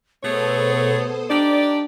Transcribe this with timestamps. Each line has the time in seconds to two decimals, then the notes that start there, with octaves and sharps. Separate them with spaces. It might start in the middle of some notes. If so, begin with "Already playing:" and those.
0.23 B2 A3 B3 G#4 A4 C5 C#5 D#6
1.30 D4 D#4 G4 D5